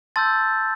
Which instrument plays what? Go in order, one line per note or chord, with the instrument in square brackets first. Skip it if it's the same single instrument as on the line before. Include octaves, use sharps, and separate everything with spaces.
[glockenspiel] A5 C6 E6 G6 A6